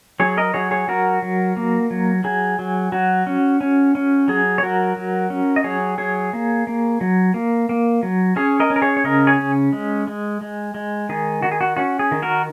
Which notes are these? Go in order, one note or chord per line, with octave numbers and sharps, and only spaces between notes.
F#3 G#4 C#5
A#4 D#5
F#3 G#4 C#5
G#4 C#5
F#3 F#4 A#4
F#3
A#3
F#3
F#3 G#4
F#3
F#3 F#4
C#4
C#4
C#4
F#3 G#4
C#5
F#3 F#4 A#4
F#3
C#4
D#5
F#3 G#4 C#5
F#3 G#4 C#5
A#3
A#3
F#3
A#3
A#3
F#3
C#4 G#4 C#5
A#4 D#5
C#4
A#4
G#4 C#5
C#5
C#3 A#4 D#5
G#4 C#5
C#4
G#3
G#3
G#3
G#3
D#3 G#4
D#3 F#4
G#4
F#4
C#4 F#4
G#4
D#3
F#4 A#4